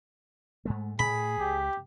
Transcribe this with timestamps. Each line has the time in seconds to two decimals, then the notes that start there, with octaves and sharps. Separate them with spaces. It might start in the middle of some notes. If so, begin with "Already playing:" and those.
0.65 G#2 G#3 A3
0.99 A2 G#4 B5
1.40 C#2 G4